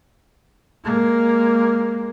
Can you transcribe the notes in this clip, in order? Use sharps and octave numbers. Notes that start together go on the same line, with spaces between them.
G#3 A#3